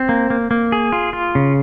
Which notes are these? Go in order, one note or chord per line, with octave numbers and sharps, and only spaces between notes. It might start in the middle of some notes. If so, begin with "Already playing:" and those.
Already playing: C4
A#3
A#3
A#3
G#4
F4
F4
C#3